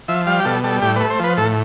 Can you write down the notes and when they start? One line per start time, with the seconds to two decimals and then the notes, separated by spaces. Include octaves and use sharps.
0.08 F3 E5
0.27 G3 F5
0.40 G4
0.45 B2 A4
0.64 G3 A4
0.82 A2 G4
0.96 A3 B4
1.10 C5
1.19 F3 B4
1.37 A2 A4